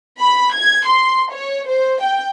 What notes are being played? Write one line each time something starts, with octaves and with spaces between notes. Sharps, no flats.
B5
G#6
C6
C#5
C5
G5